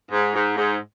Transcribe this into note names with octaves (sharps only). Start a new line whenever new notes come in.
G#2
G#2
G#2